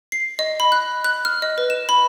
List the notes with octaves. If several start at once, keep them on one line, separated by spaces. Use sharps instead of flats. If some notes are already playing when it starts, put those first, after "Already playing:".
C7
D#5
B5
F#6
F#6
F6
D#5
B4
E7
B5